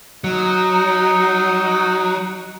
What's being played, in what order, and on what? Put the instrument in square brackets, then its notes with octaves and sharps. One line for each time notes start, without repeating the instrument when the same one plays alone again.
[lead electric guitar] F#3 [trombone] D#4